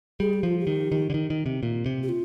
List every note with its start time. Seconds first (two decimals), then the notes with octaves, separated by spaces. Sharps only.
0.20 G3 G#4
0.33 G4
0.43 F3 F4
0.58 G4
0.67 D#3
0.92 D#3
1.10 D3
1.14 D#3
1.30 D#3
1.46 C3
1.63 A#2
1.86 C3
2.03 G4
2.09 F4